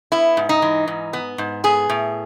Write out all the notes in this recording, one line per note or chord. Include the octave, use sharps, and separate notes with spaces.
B3 E4
G#2
D#4
E3
G#2
B3
G#2
B3 G#4
A2